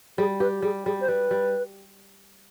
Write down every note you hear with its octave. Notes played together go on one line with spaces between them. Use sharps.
G3 G#4
G4 B4
G3 G#4
G3 G#4
C5
G3 B4
G3